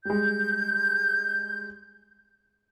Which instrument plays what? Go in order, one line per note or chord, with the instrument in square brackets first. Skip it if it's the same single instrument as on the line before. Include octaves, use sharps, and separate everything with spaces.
[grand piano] G3 G#3 [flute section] G6